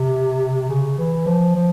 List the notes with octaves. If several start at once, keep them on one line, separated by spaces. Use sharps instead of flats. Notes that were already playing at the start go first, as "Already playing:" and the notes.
Already playing: C3
C#3
E3
F3
F3